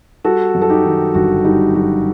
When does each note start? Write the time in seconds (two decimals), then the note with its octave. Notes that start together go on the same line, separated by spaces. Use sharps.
0.25 G3 F#4 A4
0.55 F#2
0.62 A4
0.69 D#4 G4
0.85 D#3
1.14 G1 F#4
1.45 G3 D#4
1.75 F#2 F#4